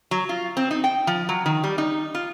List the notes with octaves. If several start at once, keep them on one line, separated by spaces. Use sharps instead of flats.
F#3
F4
C4
D#4
G5
F3
F#3
D#3
G3
D#4
F4